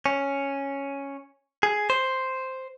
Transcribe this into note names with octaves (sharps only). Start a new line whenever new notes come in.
C#4
G#4
C5